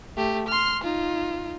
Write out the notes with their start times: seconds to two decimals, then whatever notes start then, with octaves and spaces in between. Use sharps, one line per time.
0.17 A3 G4
0.48 C6 F6
0.83 D#4 F4